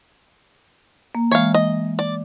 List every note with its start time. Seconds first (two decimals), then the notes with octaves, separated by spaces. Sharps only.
1.15 A#3
1.32 E3 G#3 C#5 F5
1.54 D#5
1.99 D5